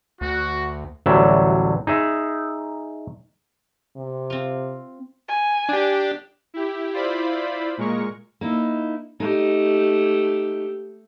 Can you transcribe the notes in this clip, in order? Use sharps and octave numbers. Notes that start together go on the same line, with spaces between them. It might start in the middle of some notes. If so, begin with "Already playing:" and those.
D2 F#4
A1 D2 F#3 G3 E5
D#4 G#4 E5
C3
C4 F4
G#5
D4 G4
E4 G4
E4 F4 C5 D5 B5
A#2 G#3 A#4 C#6
A#3 D#4 E4
A3 D#4 G4